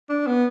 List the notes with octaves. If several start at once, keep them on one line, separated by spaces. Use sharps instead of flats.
D4
B3